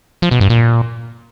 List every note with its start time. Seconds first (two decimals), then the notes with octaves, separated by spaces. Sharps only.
0.22 F3
0.31 B2
0.40 G2
0.50 A#2